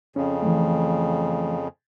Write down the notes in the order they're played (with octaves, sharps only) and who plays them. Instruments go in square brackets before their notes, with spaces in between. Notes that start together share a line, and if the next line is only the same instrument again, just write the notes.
[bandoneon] F2 C#3 [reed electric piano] C#4
[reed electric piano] E3 F3 A3